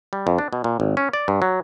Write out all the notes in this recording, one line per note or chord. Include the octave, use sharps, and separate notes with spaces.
G3
F2
D4
B2
A#2
G#1
C#4
D5
G2
F#3